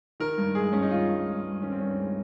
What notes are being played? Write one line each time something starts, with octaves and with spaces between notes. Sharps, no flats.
D#3 A#4
G2
G#3 G#4
G2 C#4
D#4
D#3 F4
G2
G#3
G2
D#3 C#4
C4
G2 C#4
G#3